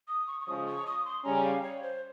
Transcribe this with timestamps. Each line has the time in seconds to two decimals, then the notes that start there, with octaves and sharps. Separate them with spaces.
0.08 D#6
0.27 C#6
0.41 C#6
0.47 C#3 F3 G#3 D#6
0.67 C#6
0.86 D#6
1.05 C6
1.24 C#3 G3 C#4 A#5
1.44 F5
1.63 C#5
1.83 C5